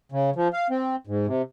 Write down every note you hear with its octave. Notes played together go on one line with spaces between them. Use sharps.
C#3
F3
F5
C4
G#2
C3